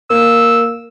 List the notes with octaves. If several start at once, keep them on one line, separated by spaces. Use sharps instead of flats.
A#3 E6